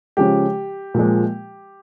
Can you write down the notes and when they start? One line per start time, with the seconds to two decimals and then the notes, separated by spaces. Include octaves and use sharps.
0.17 C#3 F3 G#3 G4
0.94 A#2 F3 G#3